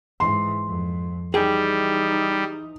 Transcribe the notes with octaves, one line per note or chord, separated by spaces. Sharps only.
G#2 E3 C6
F2
E3 G3 D#4 G#4 G5